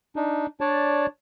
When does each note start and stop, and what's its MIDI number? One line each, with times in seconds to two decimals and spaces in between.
0.16 0.46 62
0.16 0.46 63
0.61 1.06 62
0.61 1.06 73
0.61 1.06 74
0.61 1.06 81